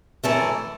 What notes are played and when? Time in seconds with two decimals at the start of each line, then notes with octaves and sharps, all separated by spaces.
0.24 F#2 E3 A3 E4 A4